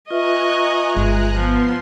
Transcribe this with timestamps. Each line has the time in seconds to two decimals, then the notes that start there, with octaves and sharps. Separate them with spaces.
0.11 F4 B4 D#5 E5 G#5 A#5 C#6 F#6
0.96 G1 G#3
1.37 F3 B3 C6